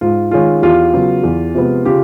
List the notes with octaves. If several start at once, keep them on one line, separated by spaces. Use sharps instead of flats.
G#2 F4
D#3 G#3 C#4 F4
E2 F4 G4
C#3 F#3 B3
E2
C3 F3 G#3 B3
C#3 F4 G4